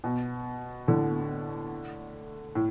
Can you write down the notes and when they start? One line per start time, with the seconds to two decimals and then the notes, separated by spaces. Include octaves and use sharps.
0.04 B2
0.88 A2 D3
2.55 A2